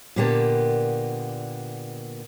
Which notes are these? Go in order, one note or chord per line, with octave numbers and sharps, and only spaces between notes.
A#2 D3 A#3 B3 G4 A5